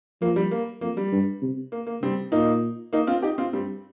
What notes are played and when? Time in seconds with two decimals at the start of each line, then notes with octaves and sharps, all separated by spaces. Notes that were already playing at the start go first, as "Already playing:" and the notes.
0.22 F3 A#3
0.36 G3
0.51 A#3
0.81 F2 A#3
0.97 G3
1.12 G2
1.42 C3
1.72 A#3
1.87 A#3
2.02 C3 G3 C4
2.32 A#2 A#3 D#4
2.93 A#3 D#4
3.07 C4 F4
3.22 D#4 G4
3.38 C4 F4
3.53 G2 G3 C4